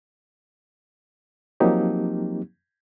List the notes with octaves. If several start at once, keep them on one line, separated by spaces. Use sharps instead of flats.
F3 F#3 A#3 C4 D#4 G4